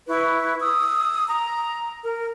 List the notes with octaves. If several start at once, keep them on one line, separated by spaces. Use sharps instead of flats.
E4 B4 C#6
D#6 E6
A#5
A#4